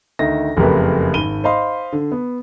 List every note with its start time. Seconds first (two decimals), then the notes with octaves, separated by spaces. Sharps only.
0.19 D2 D#3 D#4 A#6
0.57 F#1 F2 A3 G4 A#4 B4
1.13 G#1 B5 D#7 G7
1.44 C5 D#5 F5 B5 C6
1.93 D3
2.12 B3